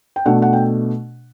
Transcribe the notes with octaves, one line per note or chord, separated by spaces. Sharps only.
G5
B2 A3 D4 F#5
F#5
G5